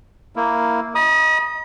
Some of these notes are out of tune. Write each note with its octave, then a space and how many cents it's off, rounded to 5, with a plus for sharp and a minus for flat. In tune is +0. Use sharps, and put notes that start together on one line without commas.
A#3 +0 E4 +0
D#5 +0 B5 -45 D#6 +0